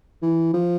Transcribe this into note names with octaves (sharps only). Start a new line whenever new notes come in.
E3
F3